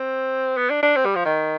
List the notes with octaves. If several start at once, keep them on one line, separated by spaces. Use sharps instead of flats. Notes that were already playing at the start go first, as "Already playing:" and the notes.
Already playing: C4
B3
D4
D4
C4
G3
F3
D#3